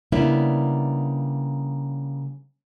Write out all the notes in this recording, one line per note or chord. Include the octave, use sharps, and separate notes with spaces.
C#3 G3 A#3 B3 D4 E4